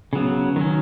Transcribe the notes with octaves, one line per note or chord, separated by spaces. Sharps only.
C#3 F#3 B3
D#3 F#3 C#4